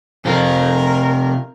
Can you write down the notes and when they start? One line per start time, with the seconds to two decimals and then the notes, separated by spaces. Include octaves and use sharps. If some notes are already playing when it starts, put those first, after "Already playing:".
0.25 C3 C4 F4 A#4